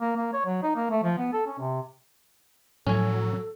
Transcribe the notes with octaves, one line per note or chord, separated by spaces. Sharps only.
A#3
A#3
C#5
F#3
D#4
A#3
A3
F3
B3
A4
C#4
C3
A2 F3 F#3 C#4 A4 G#5